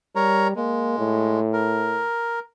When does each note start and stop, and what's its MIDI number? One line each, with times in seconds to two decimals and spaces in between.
0.16 0.52 55
0.16 0.48 70
0.16 0.48 73
0.16 0.48 82
0.56 1.40 56
0.56 0.98 58
0.98 2.05 45
1.53 2.39 70